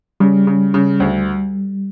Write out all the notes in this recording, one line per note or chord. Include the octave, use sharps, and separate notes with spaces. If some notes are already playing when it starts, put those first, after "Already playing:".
C#3 G3
C#3
C#3
D2